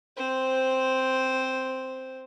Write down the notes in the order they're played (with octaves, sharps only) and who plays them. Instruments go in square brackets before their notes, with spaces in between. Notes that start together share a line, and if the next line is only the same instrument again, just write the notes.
[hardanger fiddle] C4 C5